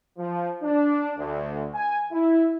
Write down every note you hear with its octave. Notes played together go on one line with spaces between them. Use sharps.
F3
D4
D2
G#5
E4